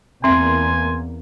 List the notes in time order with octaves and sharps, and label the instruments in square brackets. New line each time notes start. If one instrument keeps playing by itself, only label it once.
[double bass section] E2 A#3 [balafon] C4 E5 [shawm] G#5 [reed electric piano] C6